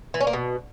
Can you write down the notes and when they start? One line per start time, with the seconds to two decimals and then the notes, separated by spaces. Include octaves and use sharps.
0.14 E3
0.21 C#4
0.27 A#3
0.33 B2